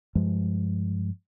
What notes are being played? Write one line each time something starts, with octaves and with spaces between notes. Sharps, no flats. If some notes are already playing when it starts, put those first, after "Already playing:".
G2 F3 G#3